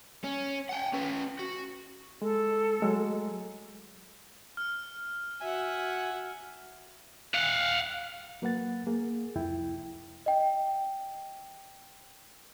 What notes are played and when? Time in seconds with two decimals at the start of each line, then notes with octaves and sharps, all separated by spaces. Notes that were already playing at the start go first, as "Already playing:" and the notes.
0.24 C#4
0.69 F#5 G5
0.93 C#4 B4
1.39 F#4
2.22 G#3 A4
2.80 F#3 G#3 A3
4.57 F6
5.41 F#4 E5 F#5 G#5
7.34 F5 F#5
8.42 F#3 A#3 B4 F#5 A6
8.87 A#3 G#4
9.35 C2 F2 E4 G5
10.26 D#5 G5